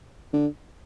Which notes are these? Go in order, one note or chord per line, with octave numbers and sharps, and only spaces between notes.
D3